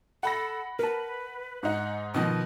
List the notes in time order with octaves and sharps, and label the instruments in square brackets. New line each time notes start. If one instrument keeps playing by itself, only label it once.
[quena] A4 [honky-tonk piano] F#5 B5 A#6
[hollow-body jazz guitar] A#4 A5 [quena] B4
[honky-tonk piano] G#2 D#4 [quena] F#5
[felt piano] B2 D#3 F3 [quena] D#5